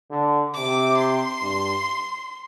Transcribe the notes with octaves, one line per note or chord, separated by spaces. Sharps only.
D3
C3 D6
C6
G2